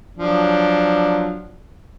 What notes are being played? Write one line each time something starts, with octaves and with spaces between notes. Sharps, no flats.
F3 F#3 D4